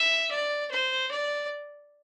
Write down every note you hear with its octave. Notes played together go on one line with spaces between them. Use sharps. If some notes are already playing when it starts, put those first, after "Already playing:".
Already playing: E5
D5
C5
D5